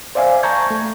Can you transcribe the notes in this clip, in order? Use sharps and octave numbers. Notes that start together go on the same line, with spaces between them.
C5 D5 E5 F5 G#5
A5 A#5 C#6 G6 G#6
A3